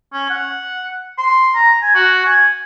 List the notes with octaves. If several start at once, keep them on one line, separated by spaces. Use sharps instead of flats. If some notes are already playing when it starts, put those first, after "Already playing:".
C#4
F#5
C6
A#5
G#5
F#4
G#5